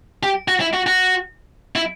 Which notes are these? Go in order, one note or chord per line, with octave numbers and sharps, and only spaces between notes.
G4
F#4
E4
F#4
F#4
E4